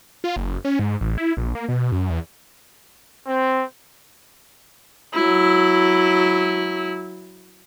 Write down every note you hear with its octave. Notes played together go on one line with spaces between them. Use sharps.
F4
F#1
C#4
G#2
A1
E4
A#1
A#3
B2
F#2
E2
C4
F#3 E4